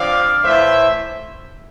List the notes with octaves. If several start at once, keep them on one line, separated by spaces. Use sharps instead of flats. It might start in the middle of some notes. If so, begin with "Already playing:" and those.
Already playing: D3 F3 C4 D5 F5
A2 E3 A3 C5 E5